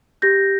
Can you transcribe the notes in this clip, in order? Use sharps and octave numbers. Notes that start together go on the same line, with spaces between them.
G4 G6 A#6